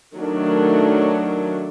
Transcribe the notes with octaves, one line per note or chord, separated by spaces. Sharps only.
D#3 F#3 A3 D4